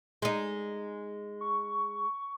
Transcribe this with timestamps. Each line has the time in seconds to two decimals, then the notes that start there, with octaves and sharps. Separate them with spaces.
0.22 G#3 D#4
1.41 C#6